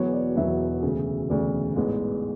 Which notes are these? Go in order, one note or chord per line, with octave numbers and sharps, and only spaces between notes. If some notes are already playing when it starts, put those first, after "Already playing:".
Already playing: E1 E2 B2 F#3 B3 C#5
D5
E1 E2 B2 F#3 B3 E5
E1 D2 C#3
E1 D2 C#3 D5
A1 G#2 G#3 B3